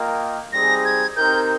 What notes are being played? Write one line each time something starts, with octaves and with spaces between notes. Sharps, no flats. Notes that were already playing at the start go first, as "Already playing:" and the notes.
Already playing: A#3 F4 A#4 D#5 G5
G3 C4 D#4 G#4 A#6
G#6
C4 D#4 G4 A#4 G6